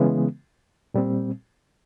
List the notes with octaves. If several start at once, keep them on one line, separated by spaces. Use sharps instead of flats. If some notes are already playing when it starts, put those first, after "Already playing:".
Already playing: C#3 E3 G#3 B3
A#2 G3 C4